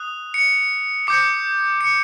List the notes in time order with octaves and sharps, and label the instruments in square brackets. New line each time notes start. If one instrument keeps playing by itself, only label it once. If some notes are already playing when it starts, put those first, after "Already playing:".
Already playing: [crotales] D#6 F#6
C#7
D6 G6 C#7
C#7